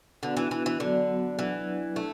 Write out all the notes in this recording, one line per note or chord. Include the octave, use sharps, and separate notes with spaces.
D3 B3 D4 F#4 B4
E3
E3
E3
D3 F#3 B3 F#4
E3 F#3 D4 B4 D5 F#5
A3 D4 A4 E5